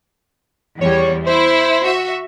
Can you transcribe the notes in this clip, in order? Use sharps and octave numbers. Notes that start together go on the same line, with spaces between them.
E2 G3 C#5
E4 C5
F#4 E5